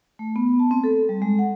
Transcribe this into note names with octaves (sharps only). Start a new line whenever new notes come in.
A3
B3
A5
C4
A4
G3
G#3
F#5